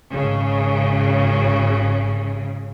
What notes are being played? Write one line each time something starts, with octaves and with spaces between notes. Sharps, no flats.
G#1 C#3